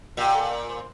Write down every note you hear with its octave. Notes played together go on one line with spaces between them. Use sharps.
A#2 G4
A4
A#4
C5